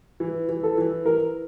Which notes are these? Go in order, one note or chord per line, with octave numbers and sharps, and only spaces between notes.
E3
E3
A4
E3
E3 A#4